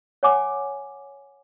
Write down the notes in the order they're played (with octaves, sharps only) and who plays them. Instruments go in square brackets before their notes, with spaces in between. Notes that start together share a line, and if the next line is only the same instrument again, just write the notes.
[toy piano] C#5 F#5 G#5 D6